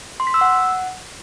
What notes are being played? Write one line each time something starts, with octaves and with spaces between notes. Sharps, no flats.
C6
B6
E6
F#5